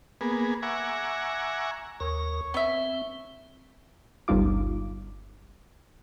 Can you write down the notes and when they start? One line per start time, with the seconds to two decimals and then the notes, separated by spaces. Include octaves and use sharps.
0.21 A#3 B3 G#4
0.62 E5 F#5 G#5 A#5 C#6 D6
2.00 D#2 A#4 C#5
2.54 B3 C4 E5
4.28 G1 C#2 G3 D#4 F4 D6